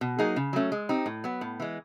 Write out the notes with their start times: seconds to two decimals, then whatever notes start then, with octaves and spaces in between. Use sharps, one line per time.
0.01 B2
0.19 F#3 A#3 D#4 G#4
0.36 C#3
0.53 F#3 A3 C#4
0.72 G#3
0.89 C4 D#4 G4
1.06 A2
1.24 F#3 B3
1.41 A2
1.60 E3 G#3